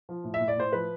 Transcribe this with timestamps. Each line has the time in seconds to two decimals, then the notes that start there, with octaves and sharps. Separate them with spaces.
0.09 F3
0.24 A2
0.34 E5
0.40 A2
0.48 D5
0.57 A2 C5
0.72 F3 B4